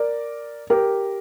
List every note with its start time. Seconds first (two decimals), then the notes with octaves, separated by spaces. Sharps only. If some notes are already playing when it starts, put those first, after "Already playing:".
Already playing: A#4 D5
0.70 G4 A#4